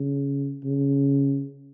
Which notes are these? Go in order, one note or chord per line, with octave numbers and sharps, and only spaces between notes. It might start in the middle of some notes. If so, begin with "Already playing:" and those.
Already playing: C#3
C#3